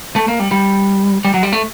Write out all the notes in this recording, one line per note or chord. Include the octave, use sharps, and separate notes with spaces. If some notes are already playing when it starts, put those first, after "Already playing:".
A3
A#3
G3
G3
G3
F#3
G3
A3